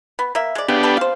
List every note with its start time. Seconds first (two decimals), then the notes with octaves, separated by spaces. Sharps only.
0.19 B3
0.35 A#3 E5
0.55 G#3 D5
0.68 C#3 B3 D4 G4
0.83 G3 A4 B4
0.97 C5 F5